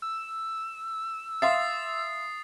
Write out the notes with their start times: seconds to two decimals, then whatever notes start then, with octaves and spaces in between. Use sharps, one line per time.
0.02 E6
1.42 E5 F5 C6 D#6 A6 C7